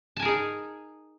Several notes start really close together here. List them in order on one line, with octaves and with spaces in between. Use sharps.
A5 G#5 A#4 G#4 D#4